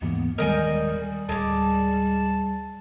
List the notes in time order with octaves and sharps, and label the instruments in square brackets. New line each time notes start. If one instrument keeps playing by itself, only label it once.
[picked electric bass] D#2 G#2 E3 [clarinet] A#3 [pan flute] B3
[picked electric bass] D#1 D#3 G#3 [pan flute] G3 [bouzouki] A#4 G5 G#5 [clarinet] D#5
[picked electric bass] D1 [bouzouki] G#3 D5 [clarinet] A5